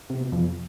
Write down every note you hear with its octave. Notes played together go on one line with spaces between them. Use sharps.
C3
B2
F2